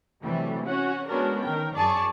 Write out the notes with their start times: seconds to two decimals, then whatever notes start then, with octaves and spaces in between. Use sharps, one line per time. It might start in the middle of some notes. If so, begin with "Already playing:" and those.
0.23 C3 E3 F#3 G3 A3
0.65 C#4 F#4 F#5
1.08 G#3 B3 C#4 D4 F#4 A#4
1.43 D#3 A#4 G5
1.77 F#2 G#4 D5 A5 C#6